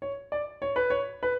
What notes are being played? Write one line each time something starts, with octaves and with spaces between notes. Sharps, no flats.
C#5
D5
C#5
B4
C#5
B4